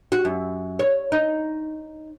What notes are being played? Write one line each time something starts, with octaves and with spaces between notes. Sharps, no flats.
F#4
F#2
C#5
D#4